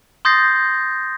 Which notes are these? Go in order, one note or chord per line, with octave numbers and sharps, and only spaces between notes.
C6 D#6 G6 A6 A#6 C7